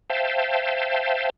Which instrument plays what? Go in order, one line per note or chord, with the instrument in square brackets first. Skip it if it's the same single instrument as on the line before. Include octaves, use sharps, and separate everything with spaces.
[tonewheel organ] C5 E5 F5 G5 A5